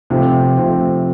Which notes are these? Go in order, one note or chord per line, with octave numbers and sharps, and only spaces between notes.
C3 F3 A3 C4
C3 F3 A3 C4